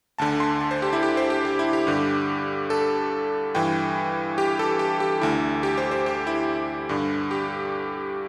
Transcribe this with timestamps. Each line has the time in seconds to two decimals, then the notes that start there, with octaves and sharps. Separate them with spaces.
0.18 D2 D3 A5
0.40 C6
0.61 A5
0.71 C5
0.82 G4
0.93 E4
1.03 G4
1.17 C5
1.30 G4
1.45 G4
1.59 E4
1.73 G4
1.87 G2 D3
2.70 A4
3.55 G2 E3 G5
4.38 G4
4.59 A4
4.79 G4
5.00 G4
5.21 D2 D3 E4
5.63 G4
5.77 C5
5.91 C5
6.06 G4
6.27 E4
6.89 G2 D3
7.31 G4